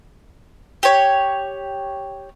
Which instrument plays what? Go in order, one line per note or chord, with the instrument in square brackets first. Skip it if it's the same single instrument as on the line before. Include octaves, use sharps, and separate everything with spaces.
[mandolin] G4 C#5